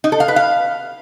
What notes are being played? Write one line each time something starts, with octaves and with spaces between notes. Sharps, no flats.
D#4
A4
F5
B4
F5